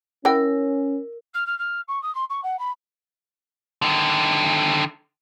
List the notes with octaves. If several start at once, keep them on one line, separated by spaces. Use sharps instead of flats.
C#4 E4 A#4 F#5 G5 E6
F6
F6
F6
C#6
D#6
C6
C#6
F#5
B5
D3 D#3